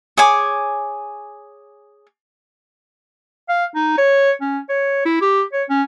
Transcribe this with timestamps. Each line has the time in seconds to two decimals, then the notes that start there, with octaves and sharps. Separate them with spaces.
0.17 G#4 C#5 G#5 D6
3.49 F5
3.75 D#4
3.98 C#5
4.41 C#4
4.69 C#5
5.05 E4
5.21 G4
5.53 C#5
5.69 C#4